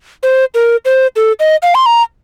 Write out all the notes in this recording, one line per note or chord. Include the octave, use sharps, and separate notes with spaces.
C5
A#4
C5
A4
D#5
F5
C6
A#5